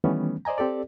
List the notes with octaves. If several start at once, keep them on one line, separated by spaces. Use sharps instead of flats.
D#3 E3 G3 A3 B3 C#4
C5 D5 D#5 G#5 A#5
C4 G4 A4 D5